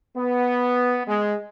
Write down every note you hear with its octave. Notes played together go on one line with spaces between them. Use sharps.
B3
G#3